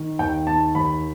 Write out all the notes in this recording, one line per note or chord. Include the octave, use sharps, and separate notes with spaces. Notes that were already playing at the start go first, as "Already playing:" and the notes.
Already playing: D#3
D#2 G5
D#3 A5
D#2 B5